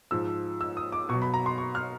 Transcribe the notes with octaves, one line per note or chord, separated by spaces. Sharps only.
G#2 F3 E6
E6
D#6
D6
B2 C#6
F#3
B5
A#5
C6
C#6
F6